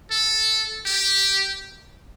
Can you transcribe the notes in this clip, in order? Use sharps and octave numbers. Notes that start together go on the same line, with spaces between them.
A4
G4